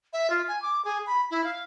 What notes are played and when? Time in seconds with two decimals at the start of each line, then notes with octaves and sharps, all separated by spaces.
0.13 E5
0.30 F4
0.48 G#5
0.62 D6
0.85 G#4
1.07 B5
1.30 E4
1.44 F5